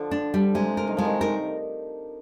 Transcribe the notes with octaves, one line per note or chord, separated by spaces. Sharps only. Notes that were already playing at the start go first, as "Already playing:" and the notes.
Already playing: D3 F3
D4
G3
C3 G#3
A#4
D#3
F3 G#3
D#3
D#3 A#4